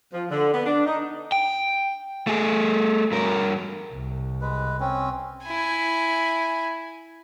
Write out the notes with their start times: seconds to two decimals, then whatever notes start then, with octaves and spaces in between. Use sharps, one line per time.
0.14 F3
0.31 D3
0.54 B3
0.66 D4
0.86 D#4
1.32 G5
2.27 A3 G#4
3.11 G2 A#4
3.93 C2
4.41 G#3 B4
4.80 C4 C#4
5.45 E4 G#5